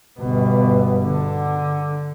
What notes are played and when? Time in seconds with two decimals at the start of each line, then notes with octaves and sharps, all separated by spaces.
0.20 G1 B2
1.05 D3